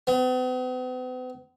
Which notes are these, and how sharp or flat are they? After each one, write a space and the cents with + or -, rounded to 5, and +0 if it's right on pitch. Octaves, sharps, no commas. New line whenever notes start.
B3 +45